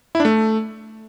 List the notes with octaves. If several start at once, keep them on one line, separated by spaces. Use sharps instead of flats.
E4
D4
A3